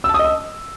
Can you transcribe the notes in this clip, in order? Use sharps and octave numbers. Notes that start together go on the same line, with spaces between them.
E6
A5
D#6
D#5
E6